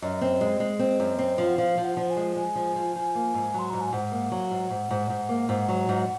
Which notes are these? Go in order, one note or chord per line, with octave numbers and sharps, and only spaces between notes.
F#2 D#5
C4
G#3
G#3
C4
F#2
C4
F3
F#5
F3 F5
F3
F#5
F3
G#5
G#3
G#3 G#5
F3
F3
F3
A#3
G#2
F#3 C6
G#2 A#5
G#5
G#2 F#5
A#3
F#3
G#2
G#2
G#2
G#2
A#3
G#2 F#5
F#3
G#2